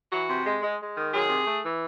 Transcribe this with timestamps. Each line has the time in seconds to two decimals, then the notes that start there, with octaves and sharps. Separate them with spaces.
0.11 E3 F#4
0.29 C3
0.45 G#3
0.62 G#3
0.79 G#3
0.96 D#3
1.13 F#3 G#4
1.29 C3
1.45 A3
1.63 E3